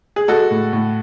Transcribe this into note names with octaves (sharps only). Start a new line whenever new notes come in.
G#4
G#3 F#4 A4
A2
A2